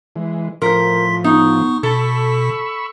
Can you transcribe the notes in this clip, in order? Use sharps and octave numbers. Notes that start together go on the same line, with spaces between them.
E3 G#3
A2 F3 A#4 C5 C6 B6
B3 D#4 C#6
B2 A4 B5 C#6 E6